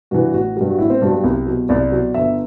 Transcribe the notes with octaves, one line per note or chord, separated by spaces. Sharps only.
G2 E3 F#4
A1 F#4
G2 F#3 G4
F#4
A1 E4
C4
G2 F#3 D4
G4
C2
B2 F#3
C2 D5
B2 F#3
G1 E5